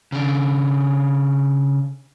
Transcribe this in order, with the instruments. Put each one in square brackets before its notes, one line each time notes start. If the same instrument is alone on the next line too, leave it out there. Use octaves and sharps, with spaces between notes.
[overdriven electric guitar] C#3 D4